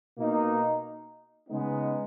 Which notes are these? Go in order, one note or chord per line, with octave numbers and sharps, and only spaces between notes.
B2 A#3 D#4
C#3 G#3 B3 D#4